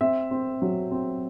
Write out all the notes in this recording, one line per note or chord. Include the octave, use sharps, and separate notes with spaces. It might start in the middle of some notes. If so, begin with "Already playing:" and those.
C4 E5
C4
F#3
C4